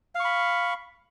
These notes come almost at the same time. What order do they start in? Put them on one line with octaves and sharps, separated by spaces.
F5 C#6 B5